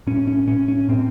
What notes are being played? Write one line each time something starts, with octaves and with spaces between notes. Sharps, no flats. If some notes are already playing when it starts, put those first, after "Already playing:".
A2 C#4
C#4
A2 C#4
C#4
A2 C4